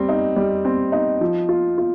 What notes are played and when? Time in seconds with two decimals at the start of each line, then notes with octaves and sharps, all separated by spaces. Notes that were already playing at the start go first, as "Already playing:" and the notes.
Already playing: G3 C4
0.09 D#4
0.36 G3
0.65 C4
0.92 D#4
1.21 F3
1.49 F4
1.78 F4